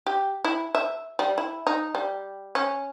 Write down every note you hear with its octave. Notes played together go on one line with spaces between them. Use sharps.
G4
E4
E5
G3
E4
D#4
G3
C#4